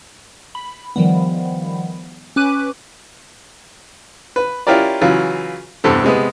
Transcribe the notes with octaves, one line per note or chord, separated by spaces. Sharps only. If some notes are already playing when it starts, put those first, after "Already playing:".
B5
D#3 F3 G3 B3
C#4 B4 D6 F#6 D#7
B4
C#4 E4 F4 G4 A#4 D5
C#3 E3 F#3 F4
E2 G2 C3 C4 A4
C3 G#3 B3